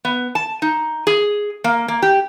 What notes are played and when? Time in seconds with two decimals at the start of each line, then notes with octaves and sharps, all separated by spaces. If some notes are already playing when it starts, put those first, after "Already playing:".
0.05 B3
0.35 A5
0.62 D#4
1.07 G#4
1.64 A#3
1.88 A#3
2.02 G4